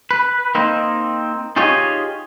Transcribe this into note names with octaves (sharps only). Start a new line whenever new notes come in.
B4
A#3 C4 D#4
D#4 F4 G4 G#4 C#5 D#5